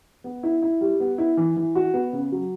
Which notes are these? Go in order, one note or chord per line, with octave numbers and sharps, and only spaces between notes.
B3
E4
E4
G3
B3
E4
E3
E3
F#4
B3
C#3
F#3